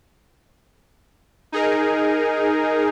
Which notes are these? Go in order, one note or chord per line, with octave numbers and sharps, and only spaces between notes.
D#4 G#4 A#4